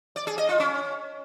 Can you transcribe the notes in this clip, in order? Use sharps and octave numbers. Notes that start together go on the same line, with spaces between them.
D5
G#4
D#5
F4
C#4